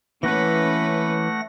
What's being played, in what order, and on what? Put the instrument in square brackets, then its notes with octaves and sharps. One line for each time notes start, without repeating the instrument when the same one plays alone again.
[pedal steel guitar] E3 F#6 [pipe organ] A3 F#5 A#6 [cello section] A#3 C#4 B4